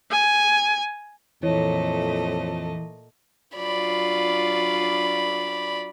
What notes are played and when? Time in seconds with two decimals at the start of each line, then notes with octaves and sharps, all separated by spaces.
0.11 G#5
1.43 F2 A#2 E3 A3 C#5 D#5
3.56 F#3 D4 F4 D5 B5